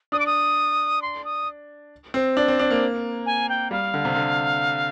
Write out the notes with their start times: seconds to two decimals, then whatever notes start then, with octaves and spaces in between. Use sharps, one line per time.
0.12 D4 D#6
0.19 D6
0.26 D#6
1.02 C6
1.25 D#6
2.14 C4
2.37 D4
2.48 C4
2.59 D4
2.71 A#3
3.26 G#5
3.49 G5
3.71 G3 F5
3.94 D3
4.05 C3
4.16 D3